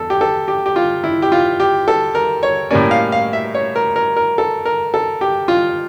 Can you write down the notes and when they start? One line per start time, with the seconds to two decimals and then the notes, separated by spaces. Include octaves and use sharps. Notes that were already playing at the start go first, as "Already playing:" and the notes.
Already playing: E2 A4
0.10 G4
0.21 A4
0.48 G4
0.66 G4
0.76 F4
1.04 E4
1.22 G4
1.32 F4
1.60 G4
1.88 A4
2.15 A#4
2.43 C#5
2.71 A2 G3 A#3 C#4 D5
2.91 F5
3.12 F5
3.33 E5
3.54 C#5
3.76 A#4
3.96 A#4
4.16 A#4
4.38 A4
4.65 A#4
4.94 A4
5.21 G4
5.48 F4